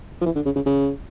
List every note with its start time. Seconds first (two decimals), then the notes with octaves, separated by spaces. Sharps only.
0.21 F3
0.25 E3
0.35 D3
0.45 C#3
0.55 C#3
0.66 C#3